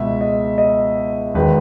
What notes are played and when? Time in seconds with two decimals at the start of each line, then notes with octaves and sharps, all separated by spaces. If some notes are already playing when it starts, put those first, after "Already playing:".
Already playing: C#2 B2 G#3 E5
0.21 D#5
0.58 D#5
1.34 E1 D#3 G#3 B4